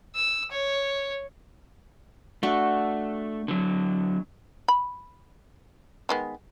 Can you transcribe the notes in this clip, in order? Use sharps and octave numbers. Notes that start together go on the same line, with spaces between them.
E6
C#5
A3 D4 F#4
D3 F#3
B5
D#3 G#3 B3